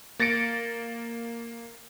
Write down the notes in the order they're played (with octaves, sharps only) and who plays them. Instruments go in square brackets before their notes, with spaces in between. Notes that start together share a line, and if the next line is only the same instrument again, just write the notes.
[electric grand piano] A#3 A6 A#6 C#7 D7